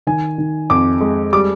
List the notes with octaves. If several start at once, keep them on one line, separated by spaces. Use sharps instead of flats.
D#3 G#5
D#3
F2 D6
G#3
G3 D6